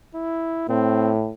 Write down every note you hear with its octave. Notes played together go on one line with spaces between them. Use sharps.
E4
A2 C4